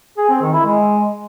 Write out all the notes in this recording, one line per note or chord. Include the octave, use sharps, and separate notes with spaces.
G#4
C4
D#3
E4
G#3